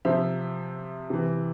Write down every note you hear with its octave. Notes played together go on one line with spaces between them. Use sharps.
C3 F3 C5 E5
C3 E3